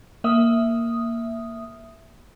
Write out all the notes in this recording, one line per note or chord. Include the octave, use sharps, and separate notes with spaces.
A#3 E5 D#6